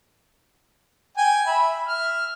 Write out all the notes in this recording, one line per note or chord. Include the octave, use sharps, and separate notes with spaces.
G5 G#5
E5 B5
E5 F6